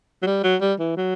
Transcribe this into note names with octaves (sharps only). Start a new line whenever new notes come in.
F#3
G3
F#3
G3
E3
F#3